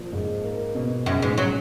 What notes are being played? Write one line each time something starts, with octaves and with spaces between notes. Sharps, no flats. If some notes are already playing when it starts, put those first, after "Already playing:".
Already playing: A#2 F3
G#2
A#3
B2
F#2 C#3
G#2
F#3 C#4